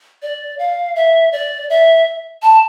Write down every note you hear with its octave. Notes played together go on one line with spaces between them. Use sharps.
D5
F5
E5
D5
E5
A5